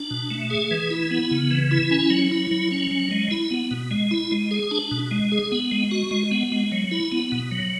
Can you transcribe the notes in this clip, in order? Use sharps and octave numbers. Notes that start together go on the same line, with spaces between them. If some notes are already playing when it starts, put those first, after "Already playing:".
Already playing: D4
B2
A3
G#4
E3
E4
B3
C#3
E3
E4
C#4
F#3
E4
F#3
C#4
F#3
G#3
E4
B3
B2
G#3
E4
G#3
G#4
D4
B2
G#3
G#4
B3
G#3
F#4
G#3
B3
G#3
F#3
E4
B3
B2
F#3